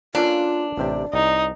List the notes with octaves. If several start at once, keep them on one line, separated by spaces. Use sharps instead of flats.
A#3 C#4 D4 F4 A4
A1 C3 G4 D5
C2 D#4